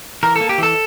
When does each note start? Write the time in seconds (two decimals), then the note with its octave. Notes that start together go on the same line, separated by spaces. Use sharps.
0.23 E3 A#4
0.36 A#3 A4
0.49 G4
0.58 E3 A4